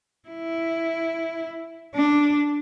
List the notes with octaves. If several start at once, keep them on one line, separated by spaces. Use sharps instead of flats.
E4
D4